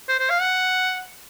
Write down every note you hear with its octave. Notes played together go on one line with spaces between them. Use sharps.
C5
C5
F5
F#5